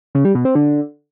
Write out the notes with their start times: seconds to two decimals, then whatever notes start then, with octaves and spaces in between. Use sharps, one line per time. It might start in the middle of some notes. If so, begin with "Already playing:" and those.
0.15 C#3
0.25 G3
0.35 B2
0.45 C4
0.55 D3